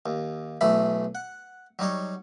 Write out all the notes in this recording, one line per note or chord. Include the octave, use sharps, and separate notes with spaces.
D#2
B1 E3 A3 B5
F#5
F#3 G3 D#4 C#5